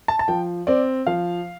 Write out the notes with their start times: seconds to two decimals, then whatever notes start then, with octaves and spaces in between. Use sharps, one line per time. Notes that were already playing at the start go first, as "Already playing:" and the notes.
0.08 A5
0.19 A5
0.28 F3 G5
0.67 C4 D5
1.07 F3 F5